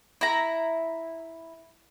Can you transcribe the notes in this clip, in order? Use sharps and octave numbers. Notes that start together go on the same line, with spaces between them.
E4 A#5